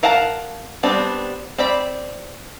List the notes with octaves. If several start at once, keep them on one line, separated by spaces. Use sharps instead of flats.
A#4 F5 F#5 A5 A#5
G3 B3 C4 D4
C4 D5 B5